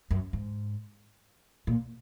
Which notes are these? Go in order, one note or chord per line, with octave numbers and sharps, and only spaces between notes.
F#2
G#2
A#2